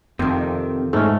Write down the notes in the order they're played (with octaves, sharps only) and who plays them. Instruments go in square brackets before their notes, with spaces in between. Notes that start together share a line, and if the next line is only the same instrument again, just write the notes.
[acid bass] F2 [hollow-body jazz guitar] C3 D#3 [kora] C4
[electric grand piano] G#2 [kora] A3 C#4